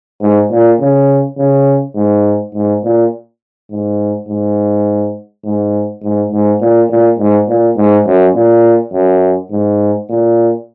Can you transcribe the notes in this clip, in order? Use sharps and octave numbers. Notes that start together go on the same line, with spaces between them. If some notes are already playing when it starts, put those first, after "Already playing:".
G#2
A#2
C#3
C#3
G#2
G#2
A#2
G#2
G#2
G#2
G#2
G#2
A#2
A#2
G#2
A#2
G#2
F#2
A#2
F#2
G#2
A#2